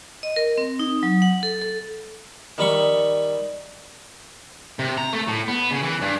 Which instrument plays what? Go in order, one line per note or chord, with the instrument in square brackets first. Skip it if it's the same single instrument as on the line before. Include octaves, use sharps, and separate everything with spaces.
[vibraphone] D#5
A#4
C4
D#4
F#3
F#5
A4
A4
[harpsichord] D#3 G3 B5 C#6
[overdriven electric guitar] C3
A#5
A3
A2
B3
C#3
E3
G2